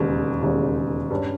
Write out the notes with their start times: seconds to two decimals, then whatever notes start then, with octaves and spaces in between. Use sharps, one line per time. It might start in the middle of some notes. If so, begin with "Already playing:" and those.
Already playing: E1 D#2 C#3
0.43 E1 D#2 C#3
1.11 G2 G3 C#4